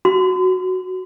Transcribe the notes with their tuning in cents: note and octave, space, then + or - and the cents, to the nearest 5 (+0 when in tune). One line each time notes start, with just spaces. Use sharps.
F#4 +0 C6 -40